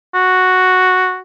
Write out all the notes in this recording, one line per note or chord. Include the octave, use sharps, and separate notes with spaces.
F#4